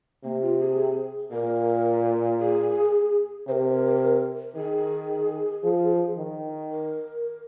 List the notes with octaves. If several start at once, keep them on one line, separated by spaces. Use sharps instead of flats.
C3 A#3
F4
G#4
A#2 A#4
G#4
C3 A#4 C5
D#3 G#4
F3
D#3
A#4